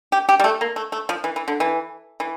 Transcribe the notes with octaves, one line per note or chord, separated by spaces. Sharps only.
G4
G4
G3
A3
A#3
A3
A3
F3
E3
E3
D3
E3
E3